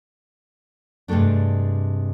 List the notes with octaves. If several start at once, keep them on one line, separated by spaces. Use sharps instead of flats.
G2 C3 G#3 A3 D4